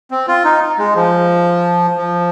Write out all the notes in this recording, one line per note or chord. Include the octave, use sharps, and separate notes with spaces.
C4
F4
D#4
G#3
F3
F3